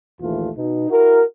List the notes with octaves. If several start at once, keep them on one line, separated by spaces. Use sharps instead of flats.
A#1 D#2 E3 A3 F4
B2 D#4
E4 F#4 A#4